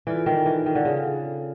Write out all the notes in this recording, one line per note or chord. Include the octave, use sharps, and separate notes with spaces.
E3 F4 A4 D5
D#3
E3
D#3
D3
C#3